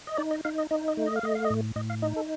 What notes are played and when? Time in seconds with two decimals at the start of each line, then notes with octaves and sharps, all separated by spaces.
0.07 D#5
0.17 D#4 D5
0.31 D#5
0.45 D#4 F5
0.58 D#5
0.71 D#4 D#5
0.88 D#5
0.97 A3
1.06 D#5
1.16 F5
1.23 A3 D#5
1.35 F5
1.44 D#5
1.50 A2
1.76 A2 D#5
1.90 F5
2.02 D#4 D#5
2.16 A4